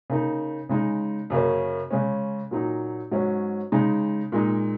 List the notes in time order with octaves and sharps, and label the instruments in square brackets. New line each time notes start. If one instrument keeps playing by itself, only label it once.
[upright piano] C#3 A#3 D#4
C#3 G#3 D#4
F#2 C#3 A#3 C#4
C#3 G#3 C#4
A#2 F#3 D#4
G#2 F#3 C#4
C#3 G#3 D#4
A#2 G#3 D#4